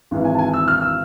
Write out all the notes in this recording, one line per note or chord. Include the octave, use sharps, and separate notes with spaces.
G#1 G#2 E3
G#5
A5
G#5
E6
F6
E6